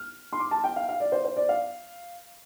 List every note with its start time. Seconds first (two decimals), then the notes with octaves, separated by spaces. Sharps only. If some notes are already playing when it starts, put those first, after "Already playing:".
Already playing: F6
0.33 C6
0.40 D6
0.51 A5
0.64 G5
0.76 F5
0.89 F5
1.00 D5
1.12 C5
1.24 C5
1.37 D5
1.49 F5